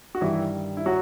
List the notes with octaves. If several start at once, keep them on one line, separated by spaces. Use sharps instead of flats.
F#4
G2 D#3 E3 G3 E4
E4
F#3 F#4